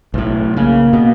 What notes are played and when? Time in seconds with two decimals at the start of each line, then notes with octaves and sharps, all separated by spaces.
0.14 B1 A2
0.57 C#3 A#3
0.93 B2